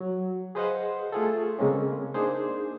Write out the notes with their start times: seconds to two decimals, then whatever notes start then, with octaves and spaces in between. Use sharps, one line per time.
0.01 F#3
0.55 G#4 B4 C5 D#5 F5 F#5
1.12 A3 F4 G#4 A4
1.59 C#3 G#3 A#3 C4 C#4
2.14 A#3 D4 D#4 G#4 C5